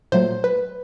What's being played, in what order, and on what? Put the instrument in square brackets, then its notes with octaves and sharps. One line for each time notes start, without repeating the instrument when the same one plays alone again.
[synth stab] A#2 F#3 A3 C5
B4